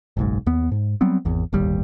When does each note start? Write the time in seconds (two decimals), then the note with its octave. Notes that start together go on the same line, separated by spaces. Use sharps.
0.17 F#1 B1 G#2
0.46 D#2 B3
0.71 G#2
1.01 F#3 G3 B3 C4
1.25 G#1 E2
1.53 D1 G1 D#2 G3